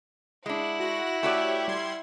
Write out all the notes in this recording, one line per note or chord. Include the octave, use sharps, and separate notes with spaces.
G#3 D4 E4 F#5
F#4 A#6
A3 F#4 G4 C#5 D5 E5
G3 C6 G#6